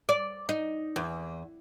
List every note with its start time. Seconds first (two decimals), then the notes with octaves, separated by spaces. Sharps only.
0.09 D5
0.49 D#4
0.96 E2